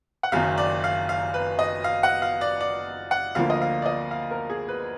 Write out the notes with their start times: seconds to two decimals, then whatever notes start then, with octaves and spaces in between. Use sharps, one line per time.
0.23 F#5
0.32 F#1 F#2 D#3 F#3 F5
0.58 D5
0.84 F5
1.09 F5
1.34 B4
1.59 D#5
1.84 F5
2.03 F#5
2.22 F5
2.41 D5
2.61 D5
3.11 F#5
3.35 D2 D3 F3 A#3 F5
3.50 D#5
3.62 F5
3.82 D5
3.86 D#5
4.11 F5
4.31 A#4
4.50 G#4
4.68 B4